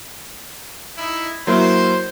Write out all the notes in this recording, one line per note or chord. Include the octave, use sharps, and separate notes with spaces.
D#4 E4
F#3 A#3 E4 C5